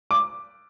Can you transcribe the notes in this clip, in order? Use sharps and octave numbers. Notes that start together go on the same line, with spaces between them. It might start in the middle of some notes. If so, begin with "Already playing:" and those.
D6